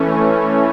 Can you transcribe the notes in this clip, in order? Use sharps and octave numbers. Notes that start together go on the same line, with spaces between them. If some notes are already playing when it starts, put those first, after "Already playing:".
Already playing: E3 A3 C#4